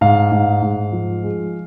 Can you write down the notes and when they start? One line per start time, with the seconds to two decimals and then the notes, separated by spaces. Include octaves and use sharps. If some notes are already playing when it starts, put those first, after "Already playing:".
0.01 G#2 F5
0.32 G#2
0.62 G#2
0.92 F3
1.23 G#3